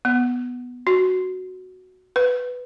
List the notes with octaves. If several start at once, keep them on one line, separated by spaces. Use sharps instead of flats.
B3
F#4
B4